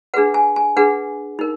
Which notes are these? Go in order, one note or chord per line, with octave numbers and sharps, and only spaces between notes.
D4 G#4 B4 F#5
G#5
G#5
D4 G#4 B4 F#5
D#4 A#4